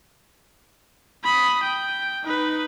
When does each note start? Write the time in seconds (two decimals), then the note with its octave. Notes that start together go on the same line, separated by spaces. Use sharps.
1.24 B5 D#6
1.63 G5
2.24 D#4 B4